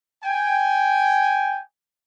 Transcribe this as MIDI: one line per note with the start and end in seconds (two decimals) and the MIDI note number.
0.24 1.60 79
0.24 1.60 80